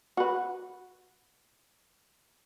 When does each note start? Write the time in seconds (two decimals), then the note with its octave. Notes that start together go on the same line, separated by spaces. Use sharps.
0.17 F#4 B4